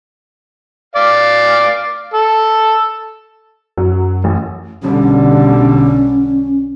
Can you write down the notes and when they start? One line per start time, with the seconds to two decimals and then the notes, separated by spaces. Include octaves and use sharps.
0.96 D5 F5
2.14 A4
3.77 F#2 F#3
4.24 A1
4.82 B1 D3 G3 C#4